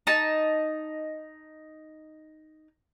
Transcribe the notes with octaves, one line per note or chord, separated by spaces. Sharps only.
D#4 A5